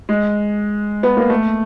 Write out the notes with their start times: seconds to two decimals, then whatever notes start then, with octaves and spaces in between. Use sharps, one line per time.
0.09 G#3
1.03 B3
1.17 A#3
1.30 A3